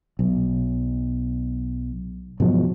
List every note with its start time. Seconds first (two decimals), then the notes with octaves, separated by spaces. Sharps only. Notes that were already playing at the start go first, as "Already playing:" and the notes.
0.19 B1
2.40 G#2 B2 F3 F#3